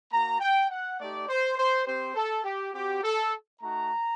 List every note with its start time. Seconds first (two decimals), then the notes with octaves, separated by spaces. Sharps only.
0.11 A#3 F#4 A#5
0.40 G5
0.70 F#5
0.99 A3 D#4 G4 D5
1.29 C5
1.58 C5
1.86 C4 G4 C5
2.15 A4
2.44 G4
2.74 C4 F#4 G4
3.03 A4
3.62 A3 D#4 F#4 A#5